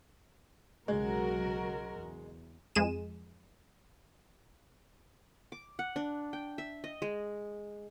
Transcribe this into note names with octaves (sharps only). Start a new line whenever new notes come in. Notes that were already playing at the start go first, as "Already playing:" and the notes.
B1 C#3 F#3 G#3 F#4 A#4
E2
F2 G#3 G#4 D#7 E7
D6
F#5
D4
G5
E5
D#5
G#3